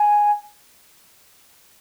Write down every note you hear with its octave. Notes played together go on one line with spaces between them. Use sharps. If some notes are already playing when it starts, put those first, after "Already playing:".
Already playing: G#5